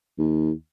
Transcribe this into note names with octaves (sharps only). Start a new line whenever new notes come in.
D#2